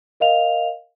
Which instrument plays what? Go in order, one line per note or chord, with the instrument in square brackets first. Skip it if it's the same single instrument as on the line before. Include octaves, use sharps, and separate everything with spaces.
[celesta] A#4 D#5 F5 F7